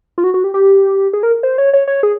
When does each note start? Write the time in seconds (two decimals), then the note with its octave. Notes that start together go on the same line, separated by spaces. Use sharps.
0.18 F4
0.24 F#4
0.34 F#4
0.44 G4
0.54 G4
1.13 G#4
1.23 A#4
1.43 C5
1.58 C#5
1.73 C#5
1.88 C#5
2.03 G#4